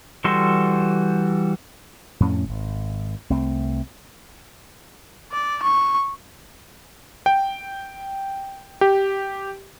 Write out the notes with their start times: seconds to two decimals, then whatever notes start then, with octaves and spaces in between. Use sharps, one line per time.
0.24 E3 G3 F#4 A4 C6
2.20 F2 A2 C#4
2.49 G#1
3.30 C2 A3 C4
5.33 D5
5.63 C#6
7.26 G5
8.81 G4